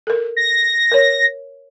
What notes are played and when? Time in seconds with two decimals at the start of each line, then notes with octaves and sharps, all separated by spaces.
0.07 A4 A#4
0.37 A#6
0.91 A#4 C#5